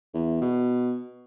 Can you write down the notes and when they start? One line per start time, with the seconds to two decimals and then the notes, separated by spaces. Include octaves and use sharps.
0.14 E2
0.41 B2